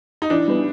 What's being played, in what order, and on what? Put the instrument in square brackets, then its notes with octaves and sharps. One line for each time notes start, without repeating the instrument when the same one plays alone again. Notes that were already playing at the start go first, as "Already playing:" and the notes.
[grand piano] D#4
[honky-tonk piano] E3 [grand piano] D4
[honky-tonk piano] G3 B3